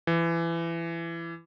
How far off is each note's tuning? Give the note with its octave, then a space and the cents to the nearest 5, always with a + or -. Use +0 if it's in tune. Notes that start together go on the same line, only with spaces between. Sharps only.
E3 +25